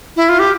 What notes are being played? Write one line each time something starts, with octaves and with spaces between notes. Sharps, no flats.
E4
F4
G4